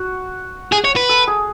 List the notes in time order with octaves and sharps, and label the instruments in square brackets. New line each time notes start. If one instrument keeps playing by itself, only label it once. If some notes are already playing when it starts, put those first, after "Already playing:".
Already playing: [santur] F#4
[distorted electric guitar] G#4
C#5
B4
[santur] A4
G#4